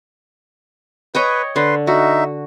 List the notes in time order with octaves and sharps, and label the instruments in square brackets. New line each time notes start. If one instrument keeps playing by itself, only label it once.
[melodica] B4 [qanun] C#5 D#5 G5
[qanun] D3 [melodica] B4 C6
[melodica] D#4 E5 [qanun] F#4